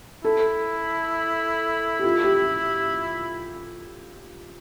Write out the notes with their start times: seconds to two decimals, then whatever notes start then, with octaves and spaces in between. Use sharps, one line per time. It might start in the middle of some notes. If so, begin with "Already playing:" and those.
0.24 E4 A4
1.99 G4
2.04 F4
2.24 G4